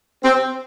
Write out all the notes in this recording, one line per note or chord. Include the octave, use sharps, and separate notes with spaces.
C4